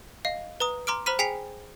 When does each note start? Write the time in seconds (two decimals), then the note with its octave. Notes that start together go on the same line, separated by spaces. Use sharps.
0.25 D#5 F5
0.60 B4 A#5 D#6
0.87 A#5 C6 D6 F6 D7
1.06 C5 A#5 B5 F6 B6 D#7
1.19 G#4 G5 G#5 B6 C7 F7